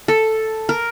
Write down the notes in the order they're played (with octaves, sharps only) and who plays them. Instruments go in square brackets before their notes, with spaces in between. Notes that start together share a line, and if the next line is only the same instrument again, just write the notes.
[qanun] A4
A#4